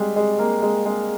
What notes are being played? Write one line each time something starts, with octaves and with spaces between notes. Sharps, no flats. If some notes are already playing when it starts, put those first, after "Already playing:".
Already playing: G3 G#3
G#3
A#3
G#3
G#3